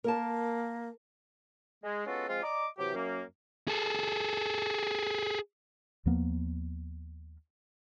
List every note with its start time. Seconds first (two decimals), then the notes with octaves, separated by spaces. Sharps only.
0.04 A#3 A#4 A5
1.84 G#3
2.06 G#3 B3 C#4 F4 F#4 A4
2.28 F3 G#3 C4 F4
2.42 D5 D#5 A#5 D6
2.78 C3 E3 F#3 G4
2.95 F#2 A#3
3.68 G#4 A4
6.06 D#2 F3 A#3 B3